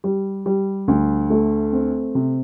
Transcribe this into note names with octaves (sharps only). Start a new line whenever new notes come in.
G3
G3
D2
A3
C4
C3